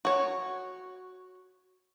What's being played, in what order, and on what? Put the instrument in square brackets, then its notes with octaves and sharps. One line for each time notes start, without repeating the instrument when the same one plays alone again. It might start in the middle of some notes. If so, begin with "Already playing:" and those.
[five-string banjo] F#4 C#5